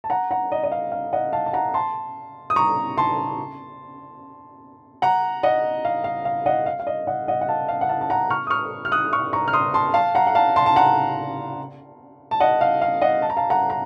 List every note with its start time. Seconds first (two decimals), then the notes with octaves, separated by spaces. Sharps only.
0.04 A5
0.10 F#5 A#5
0.31 F#5 A#5
0.52 D#5
0.64 D#5
0.72 F5
0.92 F5
1.13 D#5 F#5
1.33 F5 A5
1.46 A5
1.53 F#5 A#5
1.74 A5 C6
2.50 D#6
2.56 A#5 C#6
2.98 A5 C6
5.02 F#5 A#5
5.43 D#5 F#5
5.85 F5
6.04 F5
6.25 F5
6.46 D#5 F#5
6.66 F5
6.80 F5
6.87 D#5
7.07 D#5 F#5
7.28 D#5 F#5
7.41 F#5
7.48 F5 A5
7.69 F5
7.81 F#5
7.89 F5 A5
8.01 A5
8.10 F#5 A#5
8.30 C#6 F6
8.47 D#6
8.50 C#6 F6
8.85 F6
8.92 D#6 F#6
9.13 C#6 F6
9.33 A#5 C#6
9.48 F6
9.53 C6 D#6
9.74 A5 C6
9.94 F5 A5
10.15 F#5 A#5
10.27 F#5
10.35 F5 A5
10.56 A5 C6
10.66 A5
10.76 F#5 A#5
12.31 A5
12.40 D#5 F#5
12.61 F5
12.82 F5
13.02 D#5 F#5
13.22 A5
13.30 A#5
13.37 F5 A5
13.50 F#5 A#5
13.70 A#5